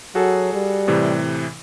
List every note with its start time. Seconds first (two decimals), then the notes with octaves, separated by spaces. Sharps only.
0.15 F#3 F#4 G#4 A4
0.53 G3
0.88 A2 C3 E3